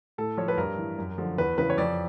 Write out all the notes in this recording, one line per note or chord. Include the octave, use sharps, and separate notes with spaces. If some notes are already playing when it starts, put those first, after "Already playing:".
A2 A4
F3 C#5
B4
G2 A#4
E3
F#2
D3 F3
E2 B4
C#3 E3 B4
C#5
F2 D5